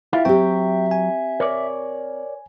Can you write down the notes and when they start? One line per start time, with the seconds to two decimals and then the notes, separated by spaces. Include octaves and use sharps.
0.13 E4 F4 G4 E5 F5
0.25 F#3 C4 G4 G5
0.91 G#5
1.40 A#4 C#5 D5